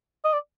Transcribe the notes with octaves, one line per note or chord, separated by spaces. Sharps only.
D#5
D5